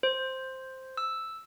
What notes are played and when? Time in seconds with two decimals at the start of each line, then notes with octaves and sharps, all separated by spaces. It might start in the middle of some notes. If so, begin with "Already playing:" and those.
0.03 C5
0.97 E6